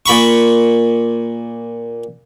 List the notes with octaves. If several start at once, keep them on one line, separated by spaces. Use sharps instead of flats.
A#2 B5 C#6